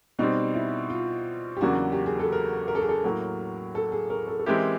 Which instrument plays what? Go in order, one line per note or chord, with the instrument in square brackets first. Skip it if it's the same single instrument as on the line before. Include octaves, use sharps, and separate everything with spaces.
[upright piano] B2 G3 C4 [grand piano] D#4
[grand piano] E4
F4
G4
[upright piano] E2 C#3 F#3 A#3 D4 [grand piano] F#4
[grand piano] G4
G#4
A4
A#4
A#4
A4
G#4
A4
[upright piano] A2 F#3 A#3 [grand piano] A#4
[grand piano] A4
G#4
A#4
A4
A4
[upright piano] E3 G#3 C4 E4 G4 [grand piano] A#4